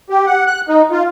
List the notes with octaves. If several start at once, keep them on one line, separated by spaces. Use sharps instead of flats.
G4
F#5
F#6
D#4
F4